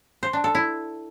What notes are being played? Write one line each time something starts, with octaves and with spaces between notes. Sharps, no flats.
C5
D4
A4
E4